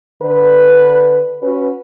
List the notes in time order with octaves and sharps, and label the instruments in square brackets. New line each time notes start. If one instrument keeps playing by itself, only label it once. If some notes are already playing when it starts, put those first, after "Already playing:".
[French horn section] D3 B4
C#4 F#4 B4